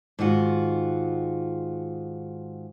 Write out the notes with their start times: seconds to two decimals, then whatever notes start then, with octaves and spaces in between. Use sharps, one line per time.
0.19 G#2 D#3 F4 F#4